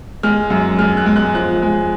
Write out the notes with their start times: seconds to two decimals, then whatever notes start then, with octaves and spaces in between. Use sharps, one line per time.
0.23 G#3 F6
0.50 F#2
0.79 G#3 F6
0.97 F#6
1.06 G#3
1.16 F#6
1.34 F3 F#6
1.62 G#3